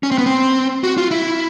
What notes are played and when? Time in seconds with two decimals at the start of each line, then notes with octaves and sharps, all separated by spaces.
0.03 C#4
0.11 C4
0.18 B3
0.26 C4
0.84 F#4
0.98 F4
1.11 E4